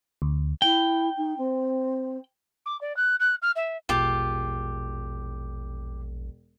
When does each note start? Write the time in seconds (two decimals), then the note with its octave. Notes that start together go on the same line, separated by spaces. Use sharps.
0.22 D2
0.62 E4 G5
1.17 D#4
1.37 C4
2.66 D6
2.81 D5
2.96 F#6
3.20 F#6
3.42 F6
3.56 E5
3.89 E1 A#1 F4 G4